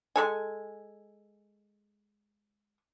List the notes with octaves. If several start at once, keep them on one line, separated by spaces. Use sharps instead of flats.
G#3 A4 G#5